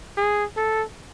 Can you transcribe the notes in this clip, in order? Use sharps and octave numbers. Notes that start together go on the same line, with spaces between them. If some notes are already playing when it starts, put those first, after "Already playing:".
G#4
A4